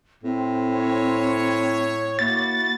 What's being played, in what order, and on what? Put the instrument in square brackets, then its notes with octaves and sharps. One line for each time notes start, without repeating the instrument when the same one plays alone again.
[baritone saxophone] A2 [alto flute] C4
[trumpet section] C#5
[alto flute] A#3 [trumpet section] E4 F#4 [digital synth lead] A6